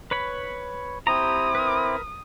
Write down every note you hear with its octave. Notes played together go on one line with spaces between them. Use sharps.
B4 C#5 B5
C4 E4 G4 A#5 D#6
A#4 B4